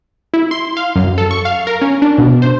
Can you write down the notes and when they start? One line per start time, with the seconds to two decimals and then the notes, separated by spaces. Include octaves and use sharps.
0.34 E4
0.51 C6
0.77 F5
0.96 F#2
1.18 A4
1.31 C#6
1.45 F5
1.67 A#4
1.82 C#4
2.02 D4
2.18 B2
2.42 C5